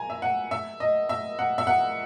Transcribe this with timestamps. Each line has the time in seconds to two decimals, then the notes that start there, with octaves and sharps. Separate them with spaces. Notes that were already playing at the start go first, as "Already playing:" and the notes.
Already playing: G#5 A#5
0.10 E5
0.22 F#5
0.51 E5
0.80 D#5
1.09 E5
1.39 F#5
1.58 E5
1.67 F#5